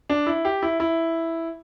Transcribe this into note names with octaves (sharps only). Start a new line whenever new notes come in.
D4
E4
G4
E4
E4